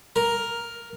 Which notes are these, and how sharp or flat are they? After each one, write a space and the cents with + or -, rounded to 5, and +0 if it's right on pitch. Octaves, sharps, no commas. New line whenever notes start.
A#4 +5